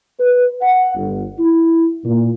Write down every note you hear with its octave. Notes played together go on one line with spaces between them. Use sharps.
B4
F#5
G1
E4
A#2